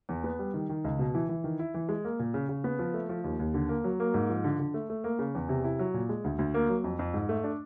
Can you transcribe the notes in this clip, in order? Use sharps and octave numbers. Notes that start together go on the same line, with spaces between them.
E2
B3
G3
D#3
D#3
C#2
B2
E3
E3
D#3
E4
E3
G#3
A#3
A#2
C#3
C#3
B3
F3
A3
F3
D#2
D#2
D3
A#3
F#3
A#3
G#2
F3
D3
D3
A3
A3
A#3
C#3
E2
C3
E4
F#3
A#2
G#3
D2
D2
A#3
F#3
F2
F2
G#2
A3
D4